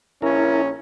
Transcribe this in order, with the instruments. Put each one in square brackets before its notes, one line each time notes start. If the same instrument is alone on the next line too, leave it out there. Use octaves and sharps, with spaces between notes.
[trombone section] A#1 C#4 [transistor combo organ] E4 A#4